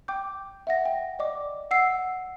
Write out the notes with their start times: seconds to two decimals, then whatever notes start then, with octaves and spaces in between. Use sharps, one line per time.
0.08 G5 D6 G6
0.67 E5 F#5 A#6
0.86 G5
1.19 D5 D#5 D6
1.71 F#5 E6 C7